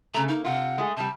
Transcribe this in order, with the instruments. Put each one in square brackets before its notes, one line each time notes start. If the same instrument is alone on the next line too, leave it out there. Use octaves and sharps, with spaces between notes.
[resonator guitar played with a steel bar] C#3 A3 [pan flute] A#5
[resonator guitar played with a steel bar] A#3 [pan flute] D#4
[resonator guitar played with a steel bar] C3 F4 [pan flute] F#5
[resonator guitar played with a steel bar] G#3 A3 G#4
[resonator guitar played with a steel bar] C3 G3 [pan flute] A5